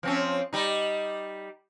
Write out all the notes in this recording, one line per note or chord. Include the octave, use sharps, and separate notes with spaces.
F3 C4 C#4
G3 D#4